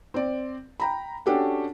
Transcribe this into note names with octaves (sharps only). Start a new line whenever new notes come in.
C4 D5
G5 A#5 B5
C#4 D4 F#4 G4 A4 F#5